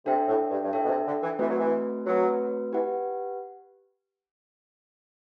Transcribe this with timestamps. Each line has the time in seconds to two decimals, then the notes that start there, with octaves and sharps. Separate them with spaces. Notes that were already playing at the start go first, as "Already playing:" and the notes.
0.06 C3 D4 A4 E5 G5
0.28 A2
0.50 G2
0.63 G2
0.73 A2 D4 A4 E5 G5
0.84 B2
0.89 C3
1.07 D3
1.23 E3
1.39 E3 A3 C4 F#4 B4
1.49 F#3
1.59 E3
2.06 F#3 A3 C4 F#4 B4
2.73 E3 G4 B4 F#5